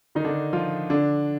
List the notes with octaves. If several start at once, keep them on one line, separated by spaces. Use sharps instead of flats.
D#3 D#4
D3 D4
F3 F4
D3 D4